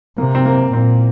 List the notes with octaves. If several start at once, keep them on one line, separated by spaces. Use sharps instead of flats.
C3 A#3
C4
A#3
A#2 C4